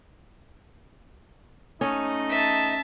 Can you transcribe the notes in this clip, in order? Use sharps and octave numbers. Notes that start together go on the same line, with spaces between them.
A3 C#4 D#4 D#5
E5 A5